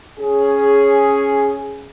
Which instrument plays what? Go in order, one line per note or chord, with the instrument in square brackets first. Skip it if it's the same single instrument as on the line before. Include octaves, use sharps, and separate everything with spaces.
[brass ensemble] C#4 G#4